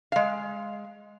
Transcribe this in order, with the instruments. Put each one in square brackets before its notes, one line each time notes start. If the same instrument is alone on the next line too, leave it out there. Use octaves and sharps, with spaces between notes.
[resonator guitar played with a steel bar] G#3 F5